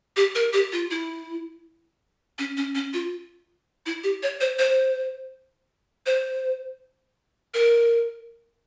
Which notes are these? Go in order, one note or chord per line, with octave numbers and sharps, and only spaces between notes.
G4
A#4
G4
F4
E4
C#4
C#4
C#4
F4
E4
G4
C#5
C5
C5
C5
A#4